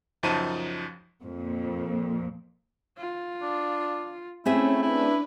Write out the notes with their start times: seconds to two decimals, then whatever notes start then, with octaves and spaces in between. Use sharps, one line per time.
0.23 C#2 F#2 F3 D#4 A5 D#7
1.23 F2 A#2
2.97 F4
3.42 D4
4.46 A3 C4 C#4 E4 G#4 E5
4.82 D4 E4 B4